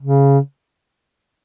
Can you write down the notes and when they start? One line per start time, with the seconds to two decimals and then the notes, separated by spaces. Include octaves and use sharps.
0.01 C#3